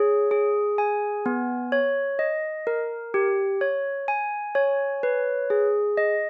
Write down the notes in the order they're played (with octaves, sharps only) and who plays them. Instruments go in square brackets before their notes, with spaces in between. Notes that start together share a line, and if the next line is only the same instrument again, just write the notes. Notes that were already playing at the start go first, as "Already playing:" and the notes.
Already playing: [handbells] G#4 C#5
G#4
G#5
B3
C#5
D#5
A#4
G4
C#5
G#5
C#5
B4
G#4
D#5